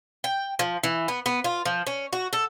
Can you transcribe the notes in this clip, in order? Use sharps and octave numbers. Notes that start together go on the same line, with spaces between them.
G5
F3
E3
B3
B3
F4
F3
C#4
F#4
A4